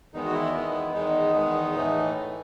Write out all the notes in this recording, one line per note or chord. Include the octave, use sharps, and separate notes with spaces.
E2 D#3 G#3 B3 D#4
F#4
E4
E2 D#3 G#3 B3
E2 D#3 G#3 B3 D#4
E2 D#3 G#3 B3
A2 E3 A3